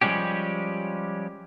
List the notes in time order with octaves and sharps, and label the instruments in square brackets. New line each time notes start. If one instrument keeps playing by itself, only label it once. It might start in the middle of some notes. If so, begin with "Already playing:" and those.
[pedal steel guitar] F3 G3 G#3 C#4 G4